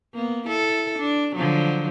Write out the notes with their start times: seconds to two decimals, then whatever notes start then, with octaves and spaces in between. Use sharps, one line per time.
0.15 A#3 B3
0.45 E4 A4
0.98 D4
1.35 D3 F3 F#3